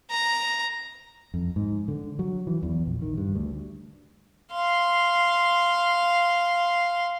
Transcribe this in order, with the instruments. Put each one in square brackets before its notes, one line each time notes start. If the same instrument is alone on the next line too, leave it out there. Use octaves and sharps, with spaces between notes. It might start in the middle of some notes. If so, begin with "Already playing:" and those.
[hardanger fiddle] A#5
[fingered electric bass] F2
G#2
D3
F#3
E3
E2
A#1
D#3
G2
D2
[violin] F5 C6